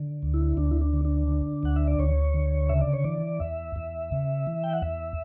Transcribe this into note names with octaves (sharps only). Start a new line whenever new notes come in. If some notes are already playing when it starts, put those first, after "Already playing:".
Already playing: D3
D2
E4
D2 D4
E4
D4
D3
D4
D3
D2 F#5
E5
D5
D2 C#5
D3
C#3 E5
D5
C#5
E3 D5
E2 E5
E2
C#3
E3
G5
F#5
E2 E5